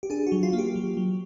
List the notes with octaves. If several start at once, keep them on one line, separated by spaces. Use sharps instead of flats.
G4
D4 G#4
F#4
F#3
F4
A#3
G4
F#3
F#3